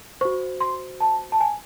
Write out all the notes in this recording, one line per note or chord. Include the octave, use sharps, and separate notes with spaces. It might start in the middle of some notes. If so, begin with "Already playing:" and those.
F#4 C5 C#6
C6
A5
A5
G#5